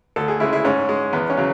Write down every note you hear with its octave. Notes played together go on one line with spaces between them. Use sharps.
D2 A4
G#4
C#3 G#3 E4
E4
G#2 C#4
G#3
E2 B3
C#4
C#3 F#3